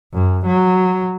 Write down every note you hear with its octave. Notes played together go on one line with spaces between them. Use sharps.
F#2
F#3